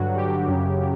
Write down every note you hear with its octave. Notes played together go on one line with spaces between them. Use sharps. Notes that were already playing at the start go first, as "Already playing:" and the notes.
Already playing: G2 D3 F#3 F#4
G2 D3 F#3 G4
F#2 C#3 F#3
F#3